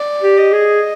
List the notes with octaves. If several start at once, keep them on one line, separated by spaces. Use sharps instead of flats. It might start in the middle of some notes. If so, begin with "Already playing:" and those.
Already playing: D5
G4
D#5
G#4